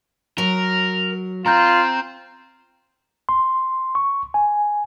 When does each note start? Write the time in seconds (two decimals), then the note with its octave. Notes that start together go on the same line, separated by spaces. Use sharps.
0.38 F#3 A#4
1.46 C4 F4 A#5 G6
3.29 C6
3.95 C#6
4.34 G#5